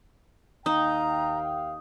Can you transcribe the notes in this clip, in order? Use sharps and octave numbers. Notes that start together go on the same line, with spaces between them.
D#2 D#4 F5 G5 A#5 D#6